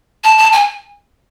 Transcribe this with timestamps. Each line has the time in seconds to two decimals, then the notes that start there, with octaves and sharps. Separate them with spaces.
0.24 A5
0.38 A5
0.52 G#5